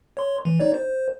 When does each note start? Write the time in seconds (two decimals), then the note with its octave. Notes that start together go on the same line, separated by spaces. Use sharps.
0.17 C#5 C6
0.45 E3
0.60 D#4 C#5 D5
0.74 C5